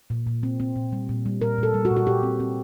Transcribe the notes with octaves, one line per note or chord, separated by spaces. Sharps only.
A#2
A#2
C4
C4
A#2
G3
A#2
G3
A#2 A#4
A#2 A4
G3
F#4
A#2
F#4
A#2 G4
C4
C4